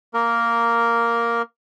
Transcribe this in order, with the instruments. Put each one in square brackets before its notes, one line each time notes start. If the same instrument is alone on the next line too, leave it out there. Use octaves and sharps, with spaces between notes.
[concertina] A#3 A#4